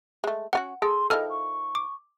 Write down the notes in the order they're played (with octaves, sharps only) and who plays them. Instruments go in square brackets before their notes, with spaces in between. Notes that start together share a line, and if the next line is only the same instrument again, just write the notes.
[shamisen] G#3 A3
[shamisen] C#4 F4 F#4 [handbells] F#5
[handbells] G#4 [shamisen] A4 [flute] C6
[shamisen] D#3 F3 E4 [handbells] A4 F6 [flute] D#5
[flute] C#6
[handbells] D6